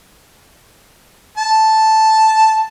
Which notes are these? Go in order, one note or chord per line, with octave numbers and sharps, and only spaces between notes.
A5